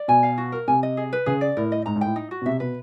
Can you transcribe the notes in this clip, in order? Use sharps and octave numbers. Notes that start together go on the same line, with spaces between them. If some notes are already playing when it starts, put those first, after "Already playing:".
Already playing: D5
B2 G#5
F5
F#4
A#4
C3 G#5
D#5
G#4
B4
C#3 G#4
D5
A2 A#4
D#5
G#2 A#5
G#2
A2 G5
D#4
F#4
B2
C3 E5
B2 B4